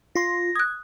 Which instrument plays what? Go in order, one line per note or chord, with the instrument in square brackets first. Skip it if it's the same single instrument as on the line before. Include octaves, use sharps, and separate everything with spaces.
[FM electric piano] F4 C6 [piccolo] A#6
[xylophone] D#6 F#6 [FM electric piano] G#6